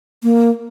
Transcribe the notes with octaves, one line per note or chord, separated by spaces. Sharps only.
A#3